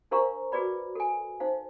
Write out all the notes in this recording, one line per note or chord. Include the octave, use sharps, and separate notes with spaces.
D4 A#4 C5 F5 A#5 C#6
F#4 G#4 B4 D5 B5
A4 G#5
D#4 C5 F5